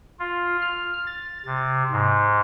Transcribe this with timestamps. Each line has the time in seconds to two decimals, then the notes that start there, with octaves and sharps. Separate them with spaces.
0.19 F4
0.62 F6
1.07 A6
1.46 C3
1.91 G#2